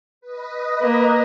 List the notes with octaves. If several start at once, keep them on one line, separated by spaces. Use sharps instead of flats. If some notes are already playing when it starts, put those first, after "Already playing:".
B4 D#5
A#3